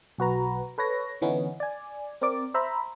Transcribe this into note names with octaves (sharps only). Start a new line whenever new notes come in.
B1 F#4 B4 A#5
A4 B4 C#5 A#6
D3 E3 B3 C#4 D#4
D5 G#5
C4 A#4 D5 D6
C5 E5 A#5 B5